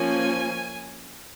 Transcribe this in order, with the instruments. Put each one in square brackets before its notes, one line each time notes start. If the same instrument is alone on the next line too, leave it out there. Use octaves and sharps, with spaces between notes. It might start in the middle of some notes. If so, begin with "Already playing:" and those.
Already playing: [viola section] F3 A#3 C#4 G#5